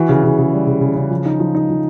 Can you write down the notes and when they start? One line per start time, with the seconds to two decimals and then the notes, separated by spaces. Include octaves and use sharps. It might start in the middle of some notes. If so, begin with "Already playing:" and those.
Already playing: E3 F#4
0.09 C#3
0.24 C#3
0.39 C#3
0.53 G3
0.67 C#3
0.81 C#3
0.96 C#3
1.11 F3
1.25 D#4
1.40 F3
1.55 D#4
1.69 F3